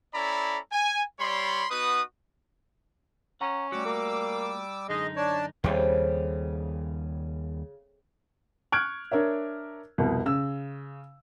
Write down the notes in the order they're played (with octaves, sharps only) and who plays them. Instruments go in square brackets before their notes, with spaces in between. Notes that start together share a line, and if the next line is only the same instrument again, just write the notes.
[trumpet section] C#4 E4 A4 D5 A#5 B5
G#5
G3 C#5 D5 B5 C6
B3 D#4 F#4 B4 D#6
[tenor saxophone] C#4 [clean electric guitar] F#5 A#5
[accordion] G3 D6 E6 [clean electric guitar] A3 F#4
[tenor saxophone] A#3
[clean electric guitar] F#2 D3 D#4 [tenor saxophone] G#3 [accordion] D#5
[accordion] D4 D5 A5 [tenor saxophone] C#5
[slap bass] D#2 G3 [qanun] C#3 A3 C4
[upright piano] C#6 F6 F#6 G#6 D7
D4 A#4 C#5 E5
C2 F2 B2
C#3 E6